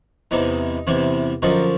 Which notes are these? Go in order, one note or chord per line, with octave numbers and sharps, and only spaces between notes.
E2 C3 E3 D#4
E2 C3 E3
F#2 D3 F3 D#4